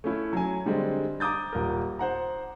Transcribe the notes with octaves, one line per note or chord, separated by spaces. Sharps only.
A3 C#4 E4
F#3 G#5
D3 G3 G#3 C4
A#5 D6 D#6 G6 A6
D#1 A#4
C5 F#5 A#5